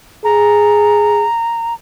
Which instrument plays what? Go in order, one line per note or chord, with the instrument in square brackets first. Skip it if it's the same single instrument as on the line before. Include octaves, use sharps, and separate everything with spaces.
[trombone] G#4 [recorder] A#5